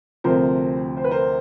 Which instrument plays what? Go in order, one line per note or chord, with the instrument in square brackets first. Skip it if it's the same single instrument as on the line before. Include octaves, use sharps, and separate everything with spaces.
[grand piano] D2 C3 F3 A#4 C5
C5
B4
A#4 C5